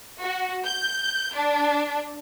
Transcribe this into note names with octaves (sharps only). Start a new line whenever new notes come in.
F#4
G6
D4